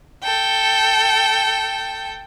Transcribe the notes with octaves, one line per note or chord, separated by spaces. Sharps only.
A4 G5